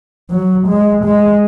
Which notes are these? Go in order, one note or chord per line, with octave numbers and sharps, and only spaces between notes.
F#3
G#3
G#3